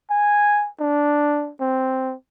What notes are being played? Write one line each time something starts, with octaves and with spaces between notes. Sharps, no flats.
G#5
D4
C4